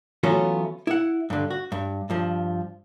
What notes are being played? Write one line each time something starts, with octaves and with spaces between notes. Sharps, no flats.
E3 F#3 A3 B3 C#4 F4
E4 F#5
G2 D3
F#4
G2
G2 F3